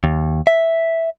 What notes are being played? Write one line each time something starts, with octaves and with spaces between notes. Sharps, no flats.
D#2
E5